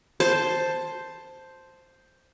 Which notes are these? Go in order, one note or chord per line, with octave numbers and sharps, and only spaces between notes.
C5 A5